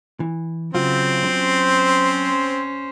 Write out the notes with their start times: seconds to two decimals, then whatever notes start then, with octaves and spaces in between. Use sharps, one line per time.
0.20 E3
0.74 C#3 F#3 C4 F4
1.27 C#4 C5